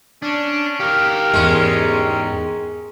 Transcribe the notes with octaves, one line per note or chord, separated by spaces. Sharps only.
C#4 D4
G4 A#4 F5
E2 G#2 G#3 C#4